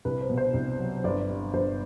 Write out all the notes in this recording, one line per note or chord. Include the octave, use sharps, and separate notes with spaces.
C2 B4
C5
B2
C5
C2
F#3
G1 D5
G2
G1 C5